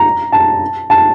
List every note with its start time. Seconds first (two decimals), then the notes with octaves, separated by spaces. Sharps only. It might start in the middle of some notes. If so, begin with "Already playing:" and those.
Already playing: A#5
0.32 A5
0.90 A5